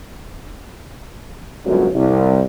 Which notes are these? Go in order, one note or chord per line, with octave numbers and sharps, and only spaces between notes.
G1 C#2 F#2
C2